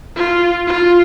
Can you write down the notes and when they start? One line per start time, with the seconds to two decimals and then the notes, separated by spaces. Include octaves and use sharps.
0.16 F4
0.67 F4